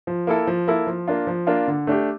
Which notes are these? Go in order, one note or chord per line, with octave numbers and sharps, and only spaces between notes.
F3
A#3 E4 A4
F3
A#3 E4 A4
F3
A#3 D4 F4
F3
A#3 D4 F4
D3
A3 D4 G4